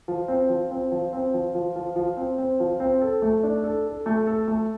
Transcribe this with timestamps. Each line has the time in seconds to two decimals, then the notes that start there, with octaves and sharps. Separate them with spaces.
0.08 F3
0.28 C4
0.49 F3
0.71 C4
0.92 F3
1.13 C4
1.34 F3
1.55 F3
1.76 F3
1.96 F3
2.17 C4
2.38 C4
2.60 F3
2.80 C4
3.01 A4
3.22 A3
3.43 D4
3.64 A4
3.86 A4
4.06 A3
4.27 A4
4.48 A3